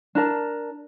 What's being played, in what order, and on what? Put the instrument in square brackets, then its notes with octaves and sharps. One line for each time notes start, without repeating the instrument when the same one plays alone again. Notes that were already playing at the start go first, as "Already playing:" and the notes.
[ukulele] D4 A#4 A5